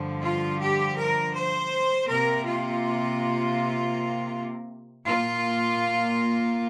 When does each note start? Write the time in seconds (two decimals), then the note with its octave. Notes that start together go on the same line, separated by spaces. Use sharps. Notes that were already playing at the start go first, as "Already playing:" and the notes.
Already playing: G2 D3 F3
0.22 F4
0.60 G4
0.97 A#4
1.34 C5
2.09 C3 A#3 A#4
2.45 F4
5.05 A#2 A#3 F4